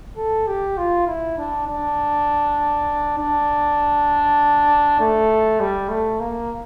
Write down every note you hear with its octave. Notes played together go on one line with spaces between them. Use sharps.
A4
G4
F4
E4
D4
D4
D4
A3
G3
A3
A#3